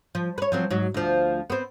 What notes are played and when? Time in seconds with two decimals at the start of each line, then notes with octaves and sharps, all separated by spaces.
0.15 F3
0.38 B4 C#5
0.52 F3 F#3 C4
0.70 G#2 F#3
0.94 D2 F3
1.50 B3 C4